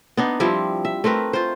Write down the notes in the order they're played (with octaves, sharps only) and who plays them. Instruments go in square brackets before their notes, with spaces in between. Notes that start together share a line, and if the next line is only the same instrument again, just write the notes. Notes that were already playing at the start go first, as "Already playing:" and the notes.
[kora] B3 D4 D#4
F3 G3 C4 E4
E5
A3 C4 A#4 B4
F4 C5